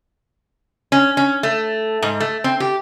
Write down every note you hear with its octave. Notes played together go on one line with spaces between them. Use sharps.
C#4
C#4
A3
G#2
A3
C4
G4